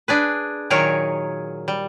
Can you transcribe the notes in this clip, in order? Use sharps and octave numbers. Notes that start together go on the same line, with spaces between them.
D4 G#4 B4
A#2 D#3 F#3 G#4 A#4 C#5
G3